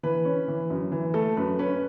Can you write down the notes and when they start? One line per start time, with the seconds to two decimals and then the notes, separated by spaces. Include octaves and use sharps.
0.03 E3 B4
0.25 C#4
0.48 E3
0.70 F#2
0.92 E3
1.14 A3 A4
1.37 F#2 B4
1.59 C#4 B4